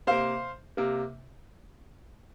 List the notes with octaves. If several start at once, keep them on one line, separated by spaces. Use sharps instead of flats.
C3 A#3 C5 F5
C3 A#3